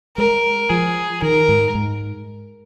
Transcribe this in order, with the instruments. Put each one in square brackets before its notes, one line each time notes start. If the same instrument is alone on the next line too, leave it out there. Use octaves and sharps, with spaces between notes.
[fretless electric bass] G#3 [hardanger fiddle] A#4
[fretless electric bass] F3 [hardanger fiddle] G#4
[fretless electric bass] D#3 [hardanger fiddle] A#4
[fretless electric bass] G#2
G#2